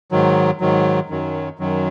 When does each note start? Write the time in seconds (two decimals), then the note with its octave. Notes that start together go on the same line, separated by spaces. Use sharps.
0.11 G#2 D#3 F#3
0.60 G#2 D#3 F#3
1.10 F#2 D#3 F#3
1.59 F#2 D#3 F#3